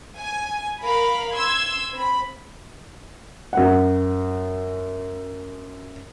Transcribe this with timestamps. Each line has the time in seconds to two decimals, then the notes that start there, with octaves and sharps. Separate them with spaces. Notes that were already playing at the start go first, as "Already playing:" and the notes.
0.18 G#5
0.83 A#4 F5 B5
1.33 C6 E6 G#6
1.92 C4 B5
3.53 F#2 F#5